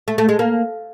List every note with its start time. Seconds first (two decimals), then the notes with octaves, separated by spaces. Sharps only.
0.08 A3
0.18 A3
0.29 G#3
0.39 A#3